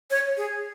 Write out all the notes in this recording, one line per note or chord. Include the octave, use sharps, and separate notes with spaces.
C#5
G#4